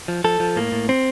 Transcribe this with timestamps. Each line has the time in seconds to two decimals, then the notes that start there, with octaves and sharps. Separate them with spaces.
0.08 F3
0.24 F3 A4
0.40 F3
0.56 A2 A#3
0.72 A2
0.89 C4